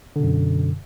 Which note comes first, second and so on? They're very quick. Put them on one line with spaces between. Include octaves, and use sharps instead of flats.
D3 B2 F#2